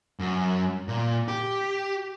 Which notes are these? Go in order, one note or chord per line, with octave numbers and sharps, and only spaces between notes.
F#2
A#2
G4